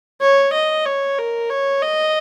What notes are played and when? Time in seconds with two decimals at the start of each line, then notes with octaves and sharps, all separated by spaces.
0.21 C#5
0.53 D#5
0.86 C#5
1.19 A#4
1.50 C#5
1.82 D#5